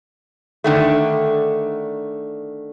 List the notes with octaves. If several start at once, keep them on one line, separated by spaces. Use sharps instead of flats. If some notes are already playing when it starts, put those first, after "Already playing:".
D3 D#3 A3